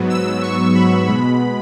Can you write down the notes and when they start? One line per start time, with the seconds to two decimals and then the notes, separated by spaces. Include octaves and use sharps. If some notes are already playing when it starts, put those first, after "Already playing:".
Already playing: G#2 F#3 B3
0.10 E6
0.42 C#6
0.75 B5
1.07 B2 G#3 B3 B5